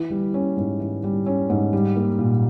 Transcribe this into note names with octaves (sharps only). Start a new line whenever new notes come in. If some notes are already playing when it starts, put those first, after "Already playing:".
Already playing: E3
G3
C#4
G#2
E3
G3
C#4
G#2
G3
A#3
A#2